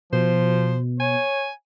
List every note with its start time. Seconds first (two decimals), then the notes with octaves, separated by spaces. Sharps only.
0.13 B2 F3 C5
1.00 C#5 G#5